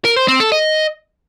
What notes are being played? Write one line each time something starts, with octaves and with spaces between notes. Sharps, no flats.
A#4
C5
C4
A4
D#5